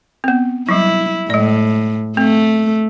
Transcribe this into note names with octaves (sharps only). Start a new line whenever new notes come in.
B3 C4
F#3 G3 E4
A2 G#3 D5
A3 C4